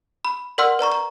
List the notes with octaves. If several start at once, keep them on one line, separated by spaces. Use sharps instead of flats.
B5
A#4 D5 F#5 C6 E6 F6
B4 D5 A#5 C#6
A#5